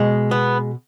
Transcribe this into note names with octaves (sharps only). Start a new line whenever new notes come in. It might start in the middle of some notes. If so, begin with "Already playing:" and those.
Already playing: B2 G#3
B3